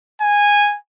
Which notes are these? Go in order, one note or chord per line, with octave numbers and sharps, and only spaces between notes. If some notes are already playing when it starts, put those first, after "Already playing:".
G#5